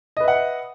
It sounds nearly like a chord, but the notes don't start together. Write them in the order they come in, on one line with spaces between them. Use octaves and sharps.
D#5 B4 E5 F#5